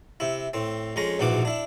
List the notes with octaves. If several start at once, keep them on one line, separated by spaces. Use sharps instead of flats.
C3 E4
A2 C4
F2 G#3 C#4 A#5
A#1 G#2 B2 E3 F#4 D6
D4 E4